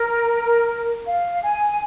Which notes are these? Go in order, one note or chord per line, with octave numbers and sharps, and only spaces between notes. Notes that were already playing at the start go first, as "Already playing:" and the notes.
Already playing: A#4
F5
G#5